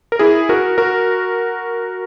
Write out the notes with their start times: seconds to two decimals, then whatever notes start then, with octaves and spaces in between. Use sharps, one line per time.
0.12 A#4
0.19 E4 G#4
0.49 F#4 A#4
0.78 F#4 A#4